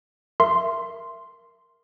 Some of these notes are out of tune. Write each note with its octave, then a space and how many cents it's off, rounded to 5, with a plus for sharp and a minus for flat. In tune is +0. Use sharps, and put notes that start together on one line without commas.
A#4 +0 E5 +20 C6 +0